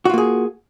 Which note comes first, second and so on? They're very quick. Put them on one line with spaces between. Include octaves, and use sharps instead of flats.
F#4 F4 A#3 G#4